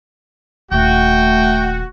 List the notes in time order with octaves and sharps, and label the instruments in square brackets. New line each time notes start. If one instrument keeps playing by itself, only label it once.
[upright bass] D#1 [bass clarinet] A3 [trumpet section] F#4 [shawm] G5